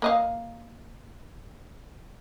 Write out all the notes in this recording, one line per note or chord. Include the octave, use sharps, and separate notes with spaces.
A#3 D#5 F5